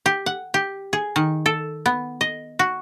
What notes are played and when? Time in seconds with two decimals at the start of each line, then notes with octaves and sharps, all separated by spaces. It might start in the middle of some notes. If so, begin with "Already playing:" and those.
0.06 G4
0.26 F#5
0.54 G4
0.93 G#4
1.16 D#3
1.46 A4
1.86 B3
2.21 D#5
2.59 F#4